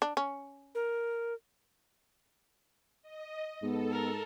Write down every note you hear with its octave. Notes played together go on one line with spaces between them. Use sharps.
D4
C#4
A#4
D#5
G#2 B3 A4
A#4